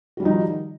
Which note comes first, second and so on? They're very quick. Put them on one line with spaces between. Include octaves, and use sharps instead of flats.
F#4 G3 F3 D#4 D#3